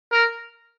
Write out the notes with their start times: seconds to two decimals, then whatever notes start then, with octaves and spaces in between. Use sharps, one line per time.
0.12 A#4